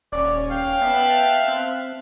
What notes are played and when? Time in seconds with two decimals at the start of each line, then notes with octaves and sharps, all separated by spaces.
0.12 D#1 C#4 D5
0.51 F5 G5
0.81 B3 E5 A5 F#6
1.48 C4